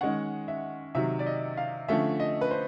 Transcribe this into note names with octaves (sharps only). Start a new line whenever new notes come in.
D#3 G#3 C#4 F#5
E5
C3 D#3 F#3 E5
D5
D#5
F5
D3 F3 A3 C#4 E5
D#5
B4
C5